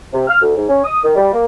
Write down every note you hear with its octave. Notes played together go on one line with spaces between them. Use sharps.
C3
F6
D2
G#2
C#4
D#6
D#3
G3
A#3